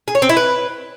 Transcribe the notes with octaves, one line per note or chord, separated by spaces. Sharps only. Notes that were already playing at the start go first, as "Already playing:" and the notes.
G#4
C#5
C4
E4
B4